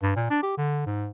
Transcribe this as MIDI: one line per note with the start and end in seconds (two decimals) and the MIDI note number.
0.03 0.12 43
0.16 0.27 46
0.30 0.42 62
0.43 0.57 67
0.58 0.83 50
0.86 1.08 44